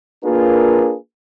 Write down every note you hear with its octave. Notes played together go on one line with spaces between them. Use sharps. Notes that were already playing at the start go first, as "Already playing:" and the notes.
A#3 D4 F4 G#4 A#4 B4